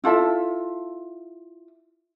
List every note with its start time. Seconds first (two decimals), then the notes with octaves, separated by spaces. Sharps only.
0.04 E4 F4 A4 E5